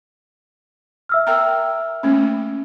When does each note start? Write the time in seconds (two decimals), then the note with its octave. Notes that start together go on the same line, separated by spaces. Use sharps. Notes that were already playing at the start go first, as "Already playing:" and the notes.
1.09 E5 E6 F6
1.27 A#4 G5 A#5
2.03 A3 A#3 C#4